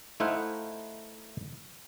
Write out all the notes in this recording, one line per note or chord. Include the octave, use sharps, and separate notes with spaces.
A3 D#4 E4 C5 F5 F#5